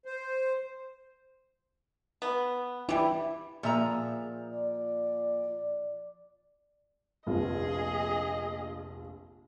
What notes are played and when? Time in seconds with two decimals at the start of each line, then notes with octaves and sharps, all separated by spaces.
0.05 C5
2.22 B3
2.89 E3 G3 E4
3.63 A#2 F3 G#4 E5 A#5
4.51 D5
7.27 F1 A#1 F4 G#4 D#5